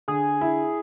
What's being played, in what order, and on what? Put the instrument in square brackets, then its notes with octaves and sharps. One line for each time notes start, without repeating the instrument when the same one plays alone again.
[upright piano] D3 [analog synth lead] G#4
[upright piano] E4